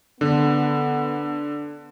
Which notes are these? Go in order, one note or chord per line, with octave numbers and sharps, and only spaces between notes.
D3 B3